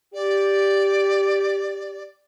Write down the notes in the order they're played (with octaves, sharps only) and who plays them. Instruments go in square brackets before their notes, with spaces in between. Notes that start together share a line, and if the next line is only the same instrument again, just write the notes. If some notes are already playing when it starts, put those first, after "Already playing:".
[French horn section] G4 [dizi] D5